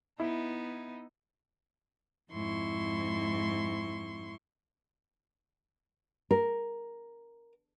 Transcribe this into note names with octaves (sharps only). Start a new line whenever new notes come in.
B3 D#4 E4
F2 G#2 E4 C6 C#6
A#4